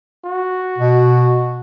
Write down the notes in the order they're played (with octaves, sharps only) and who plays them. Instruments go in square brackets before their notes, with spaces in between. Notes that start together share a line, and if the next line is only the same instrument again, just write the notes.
[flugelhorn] F#4
[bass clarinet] B2